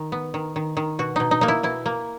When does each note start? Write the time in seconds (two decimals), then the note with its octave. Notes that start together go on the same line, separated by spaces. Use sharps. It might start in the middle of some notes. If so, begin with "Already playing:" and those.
Already playing: D#3
0.12 B3
0.34 D#3
0.56 D#3
0.77 D#3
0.99 B2 F#4
1.16 B2 D#4
1.31 D#4
1.41 A#3 D#4
1.48 E4
1.63 B2 E4
1.86 A#3